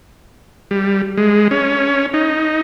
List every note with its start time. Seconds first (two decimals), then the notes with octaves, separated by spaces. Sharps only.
0.71 G3
1.18 G#3
1.51 C#4
2.14 D#4